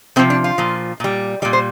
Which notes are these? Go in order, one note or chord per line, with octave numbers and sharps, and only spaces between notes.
C3 F3 C4
D4
F4
A#2 F3
A#2 G3
A#2 G3 D5
C5